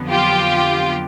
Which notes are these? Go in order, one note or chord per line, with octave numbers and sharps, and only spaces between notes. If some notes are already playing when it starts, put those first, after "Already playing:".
Already playing: F2 D3 F#3 B3
F4 G4